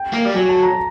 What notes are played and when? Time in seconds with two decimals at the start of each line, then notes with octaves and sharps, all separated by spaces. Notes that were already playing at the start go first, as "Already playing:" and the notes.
Already playing: G5
0.14 A#3
0.25 G3
0.34 F#3 G#5
0.49 A5
0.63 A#5